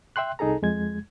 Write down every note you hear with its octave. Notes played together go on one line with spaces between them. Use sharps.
E5 G5 C6 F#6
C2 D#4 G#4 A4 A#5
F2 G#3 G#6